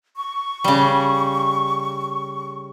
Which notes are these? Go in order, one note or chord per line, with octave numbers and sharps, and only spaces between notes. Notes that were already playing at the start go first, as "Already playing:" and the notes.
C#6
C#3 G3